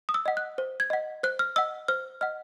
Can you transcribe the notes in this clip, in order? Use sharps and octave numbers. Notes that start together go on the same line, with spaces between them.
D#6
E6
D#5 F#5
F#6
C5
G#6
D#5 F#5
C5 F#6
F6
D#5 F#5 E6
C5 F6
D#5 F#5 F6